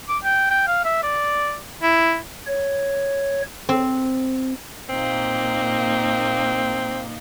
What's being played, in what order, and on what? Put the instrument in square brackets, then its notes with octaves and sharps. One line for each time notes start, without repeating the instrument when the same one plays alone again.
[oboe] D6
G5
G5
F5
E5
D5
E4
[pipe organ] C#5
[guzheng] C4
[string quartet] A#2 A#3 D#4 [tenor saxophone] C4